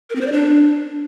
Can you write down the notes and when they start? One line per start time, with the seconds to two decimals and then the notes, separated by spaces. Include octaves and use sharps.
0.10 A#4
0.16 C4
0.21 C5
0.27 D5
0.32 D4